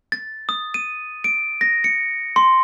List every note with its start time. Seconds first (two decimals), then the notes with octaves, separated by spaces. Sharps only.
0.12 A6
0.49 D#6
0.74 D#7
1.24 D7
1.61 A#6
1.84 C#7
2.36 C6